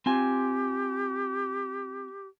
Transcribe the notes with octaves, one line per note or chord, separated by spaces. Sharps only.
C4 F4 G4 G#5